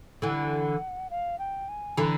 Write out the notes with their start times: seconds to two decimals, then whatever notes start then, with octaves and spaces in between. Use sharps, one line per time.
0.22 D3 E3 F#5
1.10 F5
1.39 G5
1.68 G#5
1.97 D3 E3 A#5